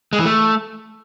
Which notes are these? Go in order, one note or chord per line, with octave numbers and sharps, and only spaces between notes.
G#3
E3
A3